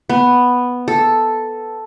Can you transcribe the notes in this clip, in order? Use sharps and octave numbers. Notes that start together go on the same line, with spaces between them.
B3
A4